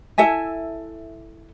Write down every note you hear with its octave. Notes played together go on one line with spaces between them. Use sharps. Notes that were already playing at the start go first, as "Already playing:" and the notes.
E4 A4 E5 G#5